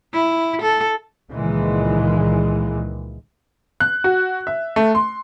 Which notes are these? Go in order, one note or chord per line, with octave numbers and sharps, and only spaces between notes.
E4
A4
C#2 A#2 D#3 E3 G#3
F#6
F#4
E5
A3
C6